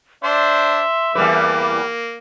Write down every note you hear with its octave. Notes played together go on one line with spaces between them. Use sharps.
D4 C5 D5 E5 C6
E2 G3 A#3 B4 D6